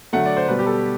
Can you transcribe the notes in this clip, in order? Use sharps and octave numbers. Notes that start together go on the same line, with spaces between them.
D3 F#3 A3 F#5
D5
C5
B2 G3 B4
G4
A4